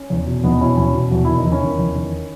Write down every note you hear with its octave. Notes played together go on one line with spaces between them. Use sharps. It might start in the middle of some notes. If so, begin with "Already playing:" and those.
Already playing: C#4
E2
B2
E2 B3 D#4
B2 C#4 E4
E2 C#4 E4
B2
E2 F#4
D#3 E4
D#4
E2
C#4 E4
D#3
E2
D#3